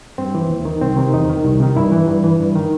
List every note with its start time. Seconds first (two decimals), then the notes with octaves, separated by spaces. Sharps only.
0.18 G2 C4
0.35 E3
0.50 D#2
0.65 D#3
0.81 C2 C4
0.97 C3 D#3
1.13 E2 D#4
1.29 D#3
1.44 C2
1.60 C3 D#3
1.77 G2 E4
1.92 E3
2.08 G2
2.24 E3
2.39 G2
2.56 D#3